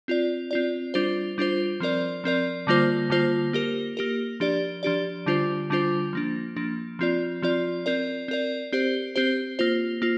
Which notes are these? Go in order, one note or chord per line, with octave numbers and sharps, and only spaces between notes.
C4 F4 D5
C4 F4 D5
G3 D4 F4 C5
G3 D4 F4 C5
F3 C4 A#4 D5
F3 C4 A#4 D5
D3 G3 A#3 F4 C5
D3 G3 A#3 F4 C5
A#3 G4 A#4
A#3 G4 A#4
F3 D4 G4 D5
F3 D4 G4 D5
D3 G3 D4 F4 C5
D3 G3 D4 F4 C5
F3 A#3 D4
F3 A#3 D4
F3 C4 F4 D5
F3 C4 F4 D5
C4 A#4 D5
C4 A#4 D5
C4 G4 C5
C4 G4 C5
A#3 F4 C5
A#3 F4